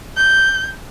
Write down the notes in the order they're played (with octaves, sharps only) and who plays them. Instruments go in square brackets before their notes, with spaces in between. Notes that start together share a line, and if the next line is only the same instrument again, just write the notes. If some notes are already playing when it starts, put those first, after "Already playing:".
[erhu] G6